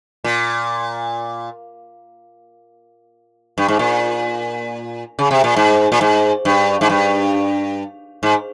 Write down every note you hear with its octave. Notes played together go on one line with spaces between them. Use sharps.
A#2
G2
G#2
A#2
C#3
C3
A#2
G#2
A#2
G#2
G2
G#2
G2
G#2